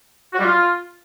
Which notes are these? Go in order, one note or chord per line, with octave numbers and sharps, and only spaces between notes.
F#4
G3
F4